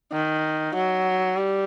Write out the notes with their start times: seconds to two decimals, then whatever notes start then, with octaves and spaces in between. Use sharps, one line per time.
0.13 D#3
0.75 F#3
1.36 G3